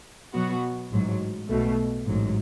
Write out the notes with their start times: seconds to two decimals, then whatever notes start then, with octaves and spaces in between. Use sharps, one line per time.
0.33 B2 F#3 B3 F#4
0.91 A1 G#2 F#3
1.48 B1 B2 A3
2.05 A1 G#2 F#3